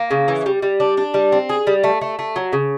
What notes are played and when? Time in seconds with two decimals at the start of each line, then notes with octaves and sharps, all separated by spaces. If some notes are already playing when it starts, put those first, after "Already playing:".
Already playing: A#3
0.11 C#3
0.28 E3
0.46 G3
0.62 G3
0.80 D4
0.97 D4
1.14 G3
1.32 C4
1.49 G#4
1.67 G3
1.84 A3
2.01 A3
2.19 A3
2.36 F#3
2.53 C#3